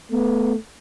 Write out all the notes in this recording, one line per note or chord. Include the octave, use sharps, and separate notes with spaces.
A3 B3